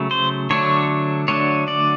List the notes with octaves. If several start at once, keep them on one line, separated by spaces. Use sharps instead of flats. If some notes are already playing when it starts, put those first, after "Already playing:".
Already playing: C#3 F#3 A3
C5
D3 F#3 A3 D4 C#5
D3 F#3 A3 D4 C#5
D5